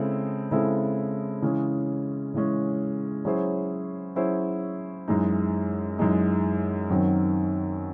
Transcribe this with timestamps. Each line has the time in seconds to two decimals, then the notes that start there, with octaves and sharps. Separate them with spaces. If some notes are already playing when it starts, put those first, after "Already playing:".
Already playing: C#3 G#3 C4 E4 A4
0.51 C#3 G#3 C4 E4 A4
1.42 C#3 E3 G#3 C#4
2.34 C#3 E3 G#3 C#4
3.25 F#3 C#4 E4 G#4 C5
4.16 F#3 C#4 E4 G#4 C5
5.08 F#2 E3 G#3 D#4
5.99 F#2 E3 G#3 D#4
6.90 F#2 D#3 F#3 C4